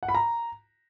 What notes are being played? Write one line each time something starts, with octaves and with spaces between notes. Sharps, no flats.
F#5
B5
A#5